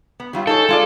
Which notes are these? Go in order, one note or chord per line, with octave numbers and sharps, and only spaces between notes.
B3
F#3 G3 F4
D#4 G#4 A4 C#5
G#3 F4 D5